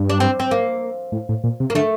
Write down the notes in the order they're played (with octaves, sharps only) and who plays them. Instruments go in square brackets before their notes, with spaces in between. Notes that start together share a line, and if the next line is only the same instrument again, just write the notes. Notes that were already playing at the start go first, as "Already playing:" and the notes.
Already playing: [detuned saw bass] G2
[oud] D4
C4
C4
A#3
[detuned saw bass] A2
A2
A#2
C3
[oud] A#3
[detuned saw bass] D3 [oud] A3